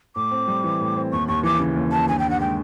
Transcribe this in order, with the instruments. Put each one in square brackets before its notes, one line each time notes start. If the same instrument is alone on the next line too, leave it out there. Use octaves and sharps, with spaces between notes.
[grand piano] A2 [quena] D6
[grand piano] C4
G3
E3
A2
C4
[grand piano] D#2 [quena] C#6
[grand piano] D#2 [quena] C#6
[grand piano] E3 [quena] D6
[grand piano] C#3
D#2
[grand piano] D#2 [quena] A5
[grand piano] G2 [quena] G#5
[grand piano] G2 [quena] G5
[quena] F#5
[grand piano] G#3 [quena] G5